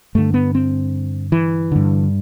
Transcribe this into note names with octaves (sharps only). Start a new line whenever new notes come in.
G2 D3 A3
B3
C4
E3
G2 D3